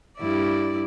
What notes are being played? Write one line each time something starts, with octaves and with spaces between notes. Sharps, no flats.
G2 E4 D5